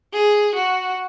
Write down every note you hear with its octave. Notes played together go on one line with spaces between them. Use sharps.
G#4
F#4